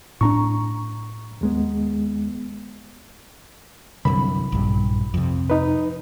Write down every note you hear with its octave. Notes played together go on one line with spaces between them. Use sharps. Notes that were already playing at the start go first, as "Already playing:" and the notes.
A2 C4 D4 A#5 C#6
D#2 G#3 B3
C2 F#2 D3 B5
A#1 G2
F2 C3
D#4 B4